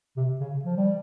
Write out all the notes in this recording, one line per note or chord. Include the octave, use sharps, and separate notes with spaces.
C3
C#3
F3
G3